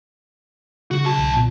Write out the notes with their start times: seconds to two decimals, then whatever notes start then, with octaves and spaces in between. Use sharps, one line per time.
0.91 C#3 F#4
1.05 B1 A5
1.18 C2
1.36 A#2